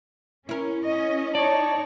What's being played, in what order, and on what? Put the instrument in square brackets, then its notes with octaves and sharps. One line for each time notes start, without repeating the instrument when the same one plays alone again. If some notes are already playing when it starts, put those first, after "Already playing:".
[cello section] C#4 [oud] E4 A#4
[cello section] C#4 D#5
[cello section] D#4 C#5 [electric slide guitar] D5 [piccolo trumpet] A5